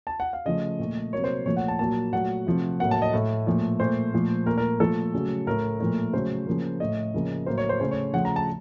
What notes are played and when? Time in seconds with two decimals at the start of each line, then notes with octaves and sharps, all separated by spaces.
0.07 A5
0.20 F#5
0.33 F5
0.45 C#3 F3 A3 D#5
0.79 A#2 A3
1.13 C3 F#3 A#3 C#5
1.24 C5
1.45 A#2 F3 A3 C#5
1.57 F#5
1.68 A5
1.79 A#2 F#3 A#3 A5
2.13 A#2 F#3 A3 F#5
2.47 C3 F3 A3
2.80 A2 F#3 A#3 F#5
2.91 A5
3.02 D#5
3.13 A2 A3
3.47 A#2 F3 A3
3.80 A#2 A3 C5
4.14 A#2 F3 A3
4.46 A#2 A3 A#4
4.58 A#4
4.79 A#2 F3 A3 A4
5.14 C#3 F#3 A3
5.47 A2 A3 A#4
5.80 A#2 F3 A3
6.13 C#3 F#3 A3 C5
6.47 C#3 F3 A#3
6.80 A2 A3 D#5
7.14 C#3 F3 A#3
7.46 A2 F#3 A#3 C5
7.58 C#5
7.69 C5
7.80 C#3 A3 C5
7.91 C#5
8.13 C#3 F3 A3 F#5
8.25 A#5
8.36 A5